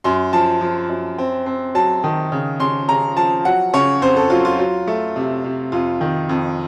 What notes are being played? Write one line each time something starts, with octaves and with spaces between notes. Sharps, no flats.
F#2 C6
F3 A5
F3
F#2
C4
C4
F#3 A5
D#3
C#3
C#3 C6
C#3 A#5
F3 A5
F#3 F#5
C#3 C#5
F2 C5
A4
F#3 F4
F4
F#3
A3
C3
C3
F2 F4
D#3
F2